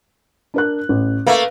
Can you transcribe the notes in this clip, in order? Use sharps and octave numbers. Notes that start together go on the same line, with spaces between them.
D4 A#4 F#6
A1
A3 A#3 B4 F5